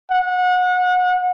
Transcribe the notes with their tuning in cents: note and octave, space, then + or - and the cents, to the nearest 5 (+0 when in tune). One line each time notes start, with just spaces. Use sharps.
F#5 -30